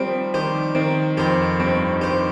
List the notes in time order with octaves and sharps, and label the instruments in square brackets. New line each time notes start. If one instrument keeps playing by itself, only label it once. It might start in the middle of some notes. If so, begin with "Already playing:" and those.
Already playing: [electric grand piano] D#3 F3 G3 [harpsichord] C4
[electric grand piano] D#3 [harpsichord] G4 C5
[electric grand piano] D#3 [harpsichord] C4
[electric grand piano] F2 [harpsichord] G4 C5
[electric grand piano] G2 [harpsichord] C4
[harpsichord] G4 C5